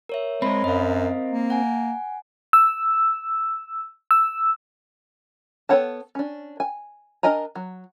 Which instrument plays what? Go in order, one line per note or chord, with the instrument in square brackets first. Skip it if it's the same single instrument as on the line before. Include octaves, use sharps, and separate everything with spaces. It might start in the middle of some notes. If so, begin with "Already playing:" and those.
[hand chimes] A#4 C#5 E5
[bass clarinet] G#3 [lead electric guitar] C4 A#4 [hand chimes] C#5 B5
[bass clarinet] F#2 [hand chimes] D#5 F5
[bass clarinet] A#3
[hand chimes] F#5 G#5
[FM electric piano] E6
E6
[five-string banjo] B3 A4 C#5 F#5 A5
C#4 D4
G#5
D4 A#4 D#5 G#5 A#5
F#3